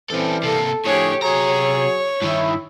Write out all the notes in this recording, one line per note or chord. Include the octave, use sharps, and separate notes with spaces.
E3 G3 C4 C#4 A4
C3 A#3 A4
A2 D3 F3 G4 G#4 C#5
C3 F#3 F#4 G#4 C#5 A#5
G2 D#3 E4